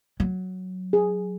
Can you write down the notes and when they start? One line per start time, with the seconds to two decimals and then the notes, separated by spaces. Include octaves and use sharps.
0.20 F#3
0.93 G#4